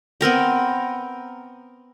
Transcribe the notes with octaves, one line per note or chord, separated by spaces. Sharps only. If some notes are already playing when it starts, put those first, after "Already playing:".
B3 C4 A#4 G5